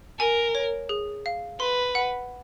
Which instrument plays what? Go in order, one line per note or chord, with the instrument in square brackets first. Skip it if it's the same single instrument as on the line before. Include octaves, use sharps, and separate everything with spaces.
[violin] A#4 [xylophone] G#5
[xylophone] C#5
G#4
F5
[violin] B4 [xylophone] C6
[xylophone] F#5